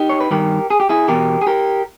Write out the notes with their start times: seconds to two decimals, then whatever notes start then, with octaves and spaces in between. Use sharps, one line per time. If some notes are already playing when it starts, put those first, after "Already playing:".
Already playing: D#4 G4
0.09 C#5
0.20 B4
0.31 G2 D#3 G4 A#4
0.70 G#4
0.80 G4
0.89 E4 G#4
1.08 E2 B2 G4 A#4
1.42 G#4
1.47 G4 A#4